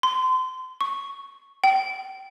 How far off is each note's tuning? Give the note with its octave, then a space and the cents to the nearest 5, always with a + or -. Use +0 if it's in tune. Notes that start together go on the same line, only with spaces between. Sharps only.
C6 -30
C#6 -5
G5 -20